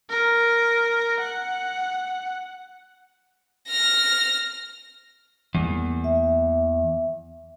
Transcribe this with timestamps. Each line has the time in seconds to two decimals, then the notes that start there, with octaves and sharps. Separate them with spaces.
0.10 A#4
1.20 F#5
3.69 F6 A#6
5.55 E2 E3 G3 A#3
6.04 E5